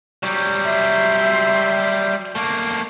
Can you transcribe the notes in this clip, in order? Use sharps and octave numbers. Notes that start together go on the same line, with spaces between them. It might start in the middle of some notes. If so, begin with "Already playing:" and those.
F#3 G3
E5 C6
A3 A#3